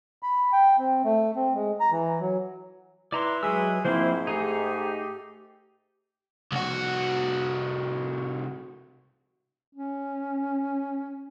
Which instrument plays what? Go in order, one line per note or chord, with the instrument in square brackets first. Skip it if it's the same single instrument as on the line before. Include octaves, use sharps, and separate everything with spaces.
[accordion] B5
G5
C4
A3
C4
G#3
A#5
E3
F#3
[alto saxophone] E4 [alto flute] B4 [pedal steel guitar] D5 A#5 C6
[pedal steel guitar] F#3 E5 E6 [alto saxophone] G#3 [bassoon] G#4
[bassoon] G#2 [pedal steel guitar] F3 A#3 C4 [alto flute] E4 [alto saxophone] C5
[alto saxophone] A3 [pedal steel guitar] D#4 G#4 [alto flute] G4
[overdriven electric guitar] C2 F#4
[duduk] C#4